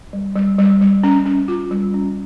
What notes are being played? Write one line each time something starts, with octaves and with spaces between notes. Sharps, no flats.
G3
G3
G3
G3
C#4
C#4
F4
G3
C#4